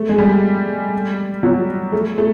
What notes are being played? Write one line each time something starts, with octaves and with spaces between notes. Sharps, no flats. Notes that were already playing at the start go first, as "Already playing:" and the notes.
Already playing: A3
G#3
G3
F#3
A3
A3